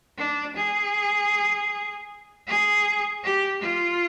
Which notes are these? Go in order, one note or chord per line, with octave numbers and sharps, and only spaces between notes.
D4
G#4
G#4
G4
F4